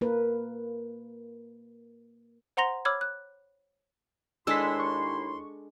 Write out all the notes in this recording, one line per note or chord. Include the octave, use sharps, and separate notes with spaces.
A#3 A#4 B4
C5 F#5 A#5 C6 A#6 F7
C#5 B5 D6 E6 F6 G#6
F#6
D#2 G#3 D4 E4 A4 C6 E6 B6
C#6